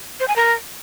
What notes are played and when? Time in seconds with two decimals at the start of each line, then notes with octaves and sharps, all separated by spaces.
0.20 C5
0.28 G#5
0.36 A#4